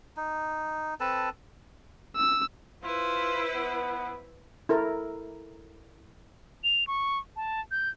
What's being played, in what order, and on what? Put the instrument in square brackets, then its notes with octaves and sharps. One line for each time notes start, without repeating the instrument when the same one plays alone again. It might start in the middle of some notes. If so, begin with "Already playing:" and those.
[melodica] D#4
C4 A4 B4 A5
[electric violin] E6
[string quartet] E4 B4 C5 [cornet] F4
[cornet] B3
[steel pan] E4 A4 A#4
[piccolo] F7
C#6
A5
G6